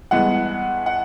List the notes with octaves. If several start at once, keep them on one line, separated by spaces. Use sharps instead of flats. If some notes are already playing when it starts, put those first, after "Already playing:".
G2 E3 G#3 B3 F#5
F#5